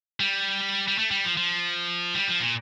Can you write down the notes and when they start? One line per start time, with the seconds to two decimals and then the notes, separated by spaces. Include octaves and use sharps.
0.20 G3
0.88 G3
0.98 A3
1.11 G3
1.25 F3
1.37 F3
2.15 G3
2.27 F3
2.41 A#2